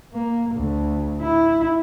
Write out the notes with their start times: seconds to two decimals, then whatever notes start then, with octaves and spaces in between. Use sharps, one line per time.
0.14 A#3
0.56 D2
1.22 E4